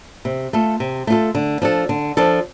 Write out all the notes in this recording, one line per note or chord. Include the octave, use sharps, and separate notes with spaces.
C3
A3 F4 A4
C3
A3 F4 A4
D3
F3 D4 A4
D3
F3 D4 A4